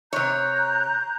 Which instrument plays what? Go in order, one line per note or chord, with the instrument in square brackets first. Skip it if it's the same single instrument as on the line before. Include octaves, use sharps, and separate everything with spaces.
[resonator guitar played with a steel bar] C3 C#5 [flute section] A#5 F#6 G6